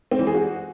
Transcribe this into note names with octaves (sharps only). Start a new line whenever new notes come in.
C4
E3
G#4
F#4